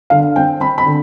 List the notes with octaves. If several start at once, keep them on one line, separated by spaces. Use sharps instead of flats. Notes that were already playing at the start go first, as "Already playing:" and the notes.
D3 F5
C4 G5
C4 B5
B5
D3